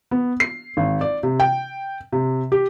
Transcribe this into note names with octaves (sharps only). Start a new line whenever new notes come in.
B3
C7
G#1
D5
C3
G5
C3
G4